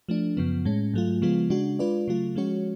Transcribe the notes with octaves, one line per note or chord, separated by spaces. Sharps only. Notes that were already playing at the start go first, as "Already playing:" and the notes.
F3 A3 D4
F#2 C#3 F3 B3
A2 G#3 C#4
G#2 F#3 A3 F4
C#3 F3 G#3 B3 F4
C#3 G#3 D4 F#4
G#3 D4 F4 B4 D5
C#3 F#3 A3 F4
F3 G#3 C#4 F#4 C#5